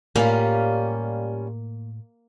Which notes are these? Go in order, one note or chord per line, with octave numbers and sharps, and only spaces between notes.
A2 G3 A#3 C#4 F4